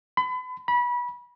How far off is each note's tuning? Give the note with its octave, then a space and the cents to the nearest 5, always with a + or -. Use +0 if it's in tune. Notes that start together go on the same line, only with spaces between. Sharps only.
B5 +35
B5 -25